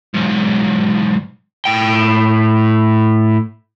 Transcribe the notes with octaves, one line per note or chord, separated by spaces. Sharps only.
B1 G#2
A2 G5